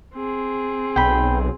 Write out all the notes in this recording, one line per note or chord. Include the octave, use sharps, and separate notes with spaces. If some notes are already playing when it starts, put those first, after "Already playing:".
C4 G#4
B1 G5 B5